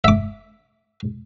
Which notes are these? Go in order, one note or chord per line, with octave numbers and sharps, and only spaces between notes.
E5 D6